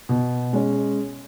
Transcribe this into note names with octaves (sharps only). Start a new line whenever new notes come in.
B2
G#3 C#4